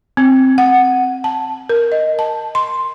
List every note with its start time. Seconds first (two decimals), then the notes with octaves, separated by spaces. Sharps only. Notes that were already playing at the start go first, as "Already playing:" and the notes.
0.17 C4
0.58 F#5
1.24 A5
1.69 A#4
1.92 D#5
2.19 A5
2.55 C6